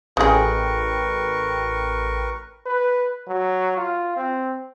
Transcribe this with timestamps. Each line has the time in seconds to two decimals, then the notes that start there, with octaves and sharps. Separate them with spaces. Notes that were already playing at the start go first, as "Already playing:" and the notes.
0.17 A1 C#3 G#4 A#4 B4 G5 C#6
2.66 B4
3.27 F#3
3.77 F4
4.16 C4